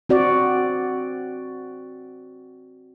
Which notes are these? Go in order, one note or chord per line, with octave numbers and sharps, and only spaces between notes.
C4 F#4 D5